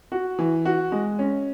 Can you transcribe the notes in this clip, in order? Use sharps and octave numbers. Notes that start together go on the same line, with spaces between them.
F#4
E3
F#4
G#3
C#4